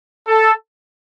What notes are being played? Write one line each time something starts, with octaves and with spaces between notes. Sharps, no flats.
A4